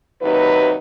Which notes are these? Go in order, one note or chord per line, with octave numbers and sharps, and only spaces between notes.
D#2 C3 F#3 D#4 B4